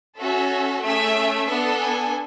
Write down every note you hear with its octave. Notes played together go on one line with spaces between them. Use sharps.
C#4 F#4 A4 E5
A3 C#4 G#4 E5
B3 D4 A4
G#5